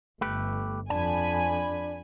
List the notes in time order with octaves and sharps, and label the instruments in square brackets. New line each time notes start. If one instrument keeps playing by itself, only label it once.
[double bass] G1 [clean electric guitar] A3 G4 B4
[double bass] F2 [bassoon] D4 [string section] G#5 B5 [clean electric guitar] A5